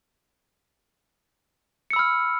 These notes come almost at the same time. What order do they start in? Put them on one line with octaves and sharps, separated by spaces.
C#7 E6 B5 F6